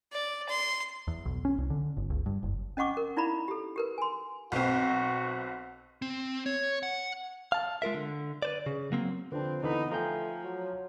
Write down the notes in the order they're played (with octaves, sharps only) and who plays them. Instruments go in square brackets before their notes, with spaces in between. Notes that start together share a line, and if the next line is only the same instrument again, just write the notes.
[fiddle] D5
C6
[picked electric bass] E2
B1
C#4
C2
D3
G1
C#2
G2
F#1
[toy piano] C#4 D#5 F#5 C#6 D6
A#4
D#4 E4 D5 F5 A#5 B5
G4 A4
G4 A#4 B4
G#5 C6
[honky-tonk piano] B1 C4 [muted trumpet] F#4
[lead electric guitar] C4
C#5
F#5
[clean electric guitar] F5 A5
G#3 F4 A#4 E5
D3
B4 C5 D5
C#3
F#3 A#3 C4
[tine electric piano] D3 D4 [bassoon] F3 [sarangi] C4 [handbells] B4
[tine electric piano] D3 E3 B5 [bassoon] B3 [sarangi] D#4
[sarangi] F3 [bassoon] A3 [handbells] F5 G5 G#5 [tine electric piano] A#5 G6
[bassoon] F#3 [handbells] C#5